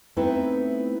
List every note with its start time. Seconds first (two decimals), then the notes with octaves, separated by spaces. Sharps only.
0.17 A3 B3 C4 D#4 E4 B4